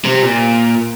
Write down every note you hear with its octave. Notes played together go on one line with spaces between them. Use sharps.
C3
A#2